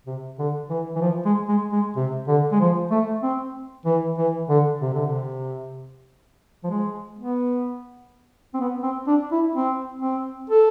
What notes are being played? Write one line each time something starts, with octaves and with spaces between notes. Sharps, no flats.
C3
D3
E3
E3
F3
G#3
G#3
G#3
C3
D3
G#3
F3
A3
C4
E3
E3
D3
C3
D3
C3
F3
G#3
B3
C4
B3
C4
D4
E4
C4
C4
A4